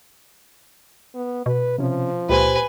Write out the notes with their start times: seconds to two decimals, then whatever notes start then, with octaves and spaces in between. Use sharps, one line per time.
1.14 B3
1.46 B2 B4
1.79 C3 F3 C#4
2.29 C#2 A#2 G4 B4 C5 G#5